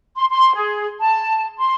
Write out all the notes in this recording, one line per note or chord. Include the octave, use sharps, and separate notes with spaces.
C6
C6
G#4
A5
C6